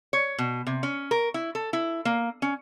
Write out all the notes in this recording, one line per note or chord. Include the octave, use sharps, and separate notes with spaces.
C#5
B2
C3
C#4
A#4
E4
A4
E4
A#3
C#4